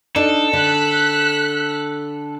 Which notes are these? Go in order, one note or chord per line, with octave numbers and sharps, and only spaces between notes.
D4 D#4 A4
D3 F#6 B6